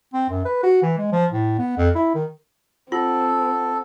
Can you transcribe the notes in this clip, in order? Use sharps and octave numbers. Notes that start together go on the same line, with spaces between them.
C4
F#2
B4
F#4
E3
G#3
F3
A2
B3
F2
E4
D#3
C4 F4 A4 F#5